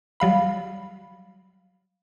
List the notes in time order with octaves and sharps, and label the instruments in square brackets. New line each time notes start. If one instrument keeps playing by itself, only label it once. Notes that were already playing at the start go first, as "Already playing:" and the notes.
[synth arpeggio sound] F#3 G3 F5 B5